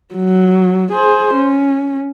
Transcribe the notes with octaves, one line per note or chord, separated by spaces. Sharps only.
F#3
G#4 C5
C#4